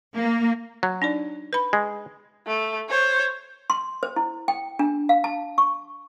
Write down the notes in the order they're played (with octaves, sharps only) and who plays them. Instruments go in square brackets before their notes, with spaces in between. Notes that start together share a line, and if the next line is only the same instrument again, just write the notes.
[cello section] A#3
[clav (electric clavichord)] F#3
[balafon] D4 D#4 D5
B4 B5
[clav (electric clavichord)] G#3
[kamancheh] A3
C5 C#5
[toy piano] C6
C5
E4
G5
D4
F5
A5
C#6